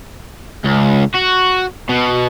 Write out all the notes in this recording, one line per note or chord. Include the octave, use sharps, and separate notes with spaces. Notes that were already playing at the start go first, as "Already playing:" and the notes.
C#2
F#4
B2